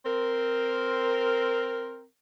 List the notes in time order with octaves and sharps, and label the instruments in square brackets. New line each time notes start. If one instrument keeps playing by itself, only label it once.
[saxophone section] C4 A#4